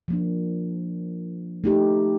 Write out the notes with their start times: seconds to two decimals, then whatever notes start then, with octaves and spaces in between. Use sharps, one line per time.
0.08 F3 A#3 D4
1.64 A3 D#4 G4